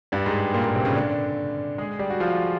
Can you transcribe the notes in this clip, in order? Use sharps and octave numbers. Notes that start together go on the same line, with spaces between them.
G2 G3
G#2 G#3
A#2 A#3
A#2 A#3
C3 C4
C#3 C#4
D3 D4
G#3 G#4
G3 G4
F#4
F3 F4